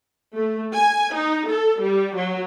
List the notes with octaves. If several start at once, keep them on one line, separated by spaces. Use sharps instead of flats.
A3
G#5
D#4
A4
G3
F#3